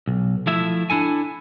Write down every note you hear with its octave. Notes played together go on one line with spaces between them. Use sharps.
B1
F3 A3 E4 E5
D4 E4 A4 G#5